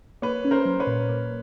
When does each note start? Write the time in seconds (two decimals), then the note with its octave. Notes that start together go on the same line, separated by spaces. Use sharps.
0.22 A#3 B4 C#5
0.45 C#4
0.51 A#4 C5
0.65 F#3
0.80 B4 C#5
0.87 A#2
1.09 A#3